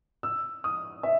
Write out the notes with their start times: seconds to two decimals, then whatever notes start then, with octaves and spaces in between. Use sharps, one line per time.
0.23 E6
0.64 D#6
1.03 E5